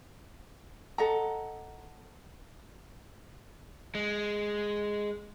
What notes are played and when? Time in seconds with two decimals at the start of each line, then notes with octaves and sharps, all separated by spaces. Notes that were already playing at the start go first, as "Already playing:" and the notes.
0.98 A4 D#5 F#5 A#5
3.95 G#3